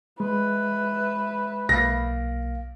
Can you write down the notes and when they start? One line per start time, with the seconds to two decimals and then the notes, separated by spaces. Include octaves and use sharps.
0.20 G#3 B4 E5
1.69 B1 A#3 F5 A#6